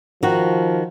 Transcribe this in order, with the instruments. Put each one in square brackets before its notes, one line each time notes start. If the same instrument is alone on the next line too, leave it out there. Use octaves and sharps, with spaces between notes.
[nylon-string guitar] D#3 F#4 [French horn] F3